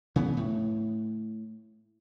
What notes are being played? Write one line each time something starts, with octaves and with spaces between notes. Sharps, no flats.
C#3 E3 B3
A2